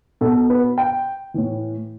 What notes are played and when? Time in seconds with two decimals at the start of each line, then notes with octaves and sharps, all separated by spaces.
0.21 B2 A4
0.50 B4
0.78 G5
1.34 A2 E3